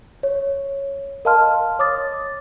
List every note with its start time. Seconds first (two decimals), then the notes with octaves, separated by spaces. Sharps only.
0.23 C#5
1.25 A#4 D#5 F5 A5 C6 F6
1.79 C#5 D6 D#6 A6